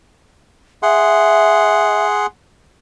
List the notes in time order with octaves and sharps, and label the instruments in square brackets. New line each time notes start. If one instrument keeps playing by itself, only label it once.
[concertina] G#4 F#5 C6 [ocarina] E5